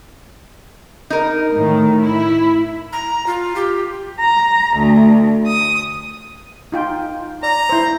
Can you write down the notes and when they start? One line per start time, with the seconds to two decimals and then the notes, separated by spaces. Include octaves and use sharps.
1.10 D#4 A#4
1.54 A2 D#3
2.02 E4
2.93 A#5
3.27 F4
3.56 G4
4.19 A#5
4.77 D2
5.46 D#6
6.72 D#4 F4 G5
7.43 D5 A#5
7.69 E4 C5